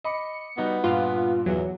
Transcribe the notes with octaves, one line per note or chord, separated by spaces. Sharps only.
D#5 B5 D6 C#7
G3 B3 D#4 F#4
G2 A#2 F4
E2 F#3